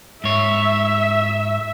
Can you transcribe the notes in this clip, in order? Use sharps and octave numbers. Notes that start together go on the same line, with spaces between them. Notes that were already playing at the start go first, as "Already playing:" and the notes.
G#2 C#5 E5